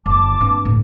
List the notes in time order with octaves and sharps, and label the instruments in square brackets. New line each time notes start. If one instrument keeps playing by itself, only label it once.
[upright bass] F#1 D3 [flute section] A5 D6
[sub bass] G2 [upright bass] A#3 C4
[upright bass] D2 A2